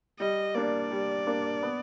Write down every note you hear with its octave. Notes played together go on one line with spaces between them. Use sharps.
G3 D#5
A#3 D4 D5
G3
A#3 D4
B3